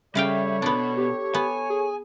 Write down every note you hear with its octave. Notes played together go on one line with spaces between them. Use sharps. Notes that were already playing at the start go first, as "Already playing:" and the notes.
C#3 G3 A4 C#5 E5 F5 G5
B2 B3 D4 B5
G4
B3 G#5
G#4